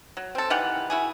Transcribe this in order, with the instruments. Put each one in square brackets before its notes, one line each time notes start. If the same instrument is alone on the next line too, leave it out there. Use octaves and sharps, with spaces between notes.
[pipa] F#3
C4 A4
D#3 E3 G4 F#5
E4 F#4 G#4